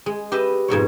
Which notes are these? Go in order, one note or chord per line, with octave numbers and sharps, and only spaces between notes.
G#3
G4 B4 D#5 E5
F2 G#2 B2 C#5